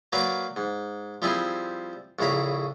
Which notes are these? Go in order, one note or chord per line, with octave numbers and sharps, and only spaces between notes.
F#3 A#3 A#4 B4 D5 F#5
G#2
F3 G3 C4 E4 G#4
A#1 A2 C#3 A#5 B5